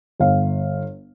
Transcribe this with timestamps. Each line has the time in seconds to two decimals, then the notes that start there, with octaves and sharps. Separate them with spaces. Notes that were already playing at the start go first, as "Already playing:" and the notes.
0.20 G1 F5